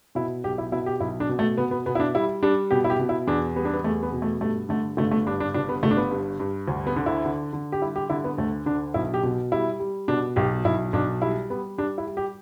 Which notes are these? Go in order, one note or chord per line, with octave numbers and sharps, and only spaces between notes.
B2 E4
B1 G4
E4
B2 E4
G4
B1 E4
D4
B2
A3
B2 B3
B3
B2 B3
E4
D4
G3 E4
G3 D4
B2 G4
E4
G4
B2
E4
E2 D4
G3 B3
D4
B3
E2 A3
B3
B2
A3
G2 A3
D3 A3
G1 A3
A3
G2 D4
D4
G1 D4
B3
G1 A3
D4
B3
G2
G2
D2
B3
D3
E4
D3
D3
G4
G3 E4
G4
D3 E4
B3
D2 A3
D3 D4
B1 E4
G4
B2
G3 E4
G3
B2 D4
B1 G4
B1 E4
B1 D4
G3 E4
G3 B3
G3 D4
E4
G3
G4